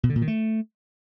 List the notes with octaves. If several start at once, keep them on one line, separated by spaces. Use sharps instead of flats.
B2
D3
A#2
D#3
A3